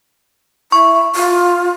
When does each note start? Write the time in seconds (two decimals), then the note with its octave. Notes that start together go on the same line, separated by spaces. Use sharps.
0.72 E4 C#6
1.15 F4